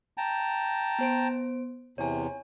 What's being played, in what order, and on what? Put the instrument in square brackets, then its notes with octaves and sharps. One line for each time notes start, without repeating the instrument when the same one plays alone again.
[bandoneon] G5 A5 A#5
[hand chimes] B3 C5 D7
[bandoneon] E2 C3 [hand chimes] C#5 G#5